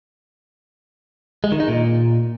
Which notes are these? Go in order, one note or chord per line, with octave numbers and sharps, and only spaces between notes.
G#3
D#3
D#4
A#2